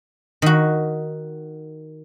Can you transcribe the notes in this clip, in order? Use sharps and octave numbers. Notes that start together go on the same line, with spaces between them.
D#3 F#4